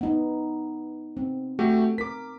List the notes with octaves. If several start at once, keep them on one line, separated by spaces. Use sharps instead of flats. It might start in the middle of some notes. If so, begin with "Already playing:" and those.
B3 D#4
C4
A3 F#4 G4
A#4 D6 B6